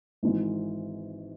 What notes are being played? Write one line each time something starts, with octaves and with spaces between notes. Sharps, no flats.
G#1 G#2 E3